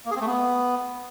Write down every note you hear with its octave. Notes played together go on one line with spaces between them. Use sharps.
A#3
G#4
C4
A3
B3